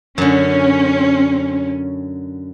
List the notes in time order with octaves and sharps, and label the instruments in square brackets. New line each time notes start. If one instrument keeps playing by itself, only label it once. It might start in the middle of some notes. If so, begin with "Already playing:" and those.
[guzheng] F#2 D3 [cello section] C#4